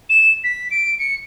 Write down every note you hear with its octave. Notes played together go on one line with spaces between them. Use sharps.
E7
B6
D7
C#7